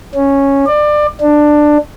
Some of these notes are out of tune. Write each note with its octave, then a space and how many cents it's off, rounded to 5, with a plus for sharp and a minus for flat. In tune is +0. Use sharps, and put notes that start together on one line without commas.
C#4 -5
D5 +25
D4 +15